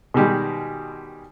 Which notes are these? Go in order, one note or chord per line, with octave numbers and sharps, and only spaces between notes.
B2 D#3 G3 G#3